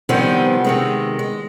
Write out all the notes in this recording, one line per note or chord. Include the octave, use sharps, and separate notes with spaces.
C3 D#3 F3 G3 B3 C4
C3 D#3 G#3
G#3